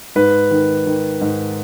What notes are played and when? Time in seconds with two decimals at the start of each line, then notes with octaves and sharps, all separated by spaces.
0.15 G#2 B4
0.51 D#3
0.86 D#3
1.21 G#2